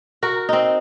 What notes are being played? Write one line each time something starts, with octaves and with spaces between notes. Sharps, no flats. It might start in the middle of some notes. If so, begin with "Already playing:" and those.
F#4 A#4
C4 D#4